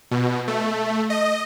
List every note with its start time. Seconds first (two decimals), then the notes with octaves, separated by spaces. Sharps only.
0.11 B2
0.48 A3
1.10 D#5